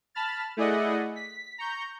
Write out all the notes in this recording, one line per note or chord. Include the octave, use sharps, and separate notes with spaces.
A5 B5 F6 A6
A3 E4 G#4 D5 D#5 F#5
B6
A#5 C#6 G6